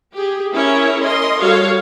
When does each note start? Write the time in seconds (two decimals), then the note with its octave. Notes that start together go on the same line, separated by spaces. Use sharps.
0.15 G4 G#4
0.54 C#4 E4 G#4 A#4 C#5
1.03 A#4 D#5 C6
1.41 G3 F#4 A4 C#5 F5